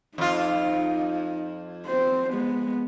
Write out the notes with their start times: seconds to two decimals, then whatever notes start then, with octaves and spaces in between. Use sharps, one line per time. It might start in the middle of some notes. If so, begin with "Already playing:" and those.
0.18 F2 D#4 F4
1.87 C4 C5
2.31 G#3 B3